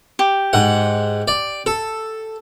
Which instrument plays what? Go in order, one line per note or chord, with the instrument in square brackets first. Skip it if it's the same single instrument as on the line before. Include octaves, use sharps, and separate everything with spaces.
[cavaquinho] G4
[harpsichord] G#2 F#5
D5
A4